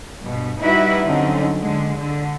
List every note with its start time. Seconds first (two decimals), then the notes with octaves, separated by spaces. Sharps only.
0.20 G2 B2
0.58 G3 D#4 E4 F#4 B4
1.04 D3 F#3 C4 C#4 D#4
1.61 D3 G#3
1.97 D3